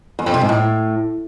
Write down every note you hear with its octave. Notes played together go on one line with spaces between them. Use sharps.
E2
F2
C3
G#2
A2